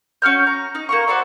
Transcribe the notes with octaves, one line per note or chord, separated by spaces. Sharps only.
C#4 F#4 F6 G6
A#5
D#4
A#3 A#5 C#6
F#4 C5 D5 E5